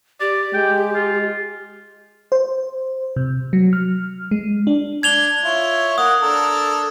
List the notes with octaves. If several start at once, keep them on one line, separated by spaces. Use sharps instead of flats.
G4 D5
G#3 G5
F4
C5
C3
F#3
F6
G#3
D4
D4 G#6 F7 G7
E4 F4 C#5
A#3 F#5 D#6
D4 A4 A#4